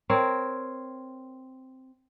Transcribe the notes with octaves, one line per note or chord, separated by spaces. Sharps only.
C4 A#4 C#5